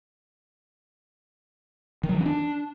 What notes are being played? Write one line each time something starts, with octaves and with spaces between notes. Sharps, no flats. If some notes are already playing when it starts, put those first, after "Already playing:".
D#3
F#3
E3
C#4
D4